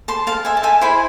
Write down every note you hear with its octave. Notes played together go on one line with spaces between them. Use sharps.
A5 C6
F5 A5
E5 G#5
A5
E5 G#5
E4 G#4 C5 G#5 B5